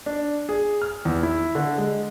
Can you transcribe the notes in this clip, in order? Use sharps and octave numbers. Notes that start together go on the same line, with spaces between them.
D4
G#4
F6
E2
E4
D3
G#3